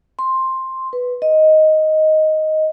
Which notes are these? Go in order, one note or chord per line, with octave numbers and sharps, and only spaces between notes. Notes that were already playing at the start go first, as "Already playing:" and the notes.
C6
B4
D#5